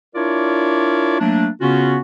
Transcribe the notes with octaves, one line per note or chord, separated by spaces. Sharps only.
D4 E4 F4 A#4 C#5 D5
F#3 A3 A#3 D4
C#3 B3 C#4 F4 F#4